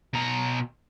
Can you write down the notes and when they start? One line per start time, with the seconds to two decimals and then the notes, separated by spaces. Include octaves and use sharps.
0.14 B2 A#5